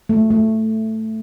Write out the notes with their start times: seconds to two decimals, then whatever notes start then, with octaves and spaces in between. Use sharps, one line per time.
0.09 A3
0.30 A3